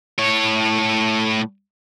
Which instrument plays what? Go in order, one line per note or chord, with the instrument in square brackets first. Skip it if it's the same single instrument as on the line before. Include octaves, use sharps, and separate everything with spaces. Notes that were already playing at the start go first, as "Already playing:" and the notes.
[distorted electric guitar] A2 C#5